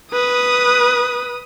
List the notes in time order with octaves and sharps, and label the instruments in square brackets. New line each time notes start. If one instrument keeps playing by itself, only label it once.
[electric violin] B4 D#6